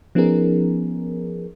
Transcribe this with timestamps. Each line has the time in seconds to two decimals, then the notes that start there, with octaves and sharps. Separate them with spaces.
0.15 F3 B3 C#4 D#4 G#4 A#4